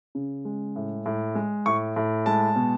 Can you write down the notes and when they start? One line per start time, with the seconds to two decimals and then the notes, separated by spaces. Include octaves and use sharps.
0.15 C#3
0.45 G#3
0.76 A2
1.06 A2
1.35 G#3
1.66 A2 C#6
1.96 A2
2.26 G#3 A5
2.56 B2